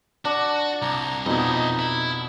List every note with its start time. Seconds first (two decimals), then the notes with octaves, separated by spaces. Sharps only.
0.25 D4 F#4
0.82 C2 A#5
1.26 F2 B2 D#4 E4 D#5
1.79 E4